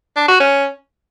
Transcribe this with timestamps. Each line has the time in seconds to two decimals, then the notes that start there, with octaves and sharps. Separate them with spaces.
0.16 D4
0.28 F#4
0.40 C#4